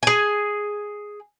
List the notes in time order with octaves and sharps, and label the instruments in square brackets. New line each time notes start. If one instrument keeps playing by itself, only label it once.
[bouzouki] G#4 G#5